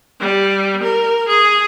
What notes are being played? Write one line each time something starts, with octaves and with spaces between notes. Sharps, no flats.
G3
A#4
G#4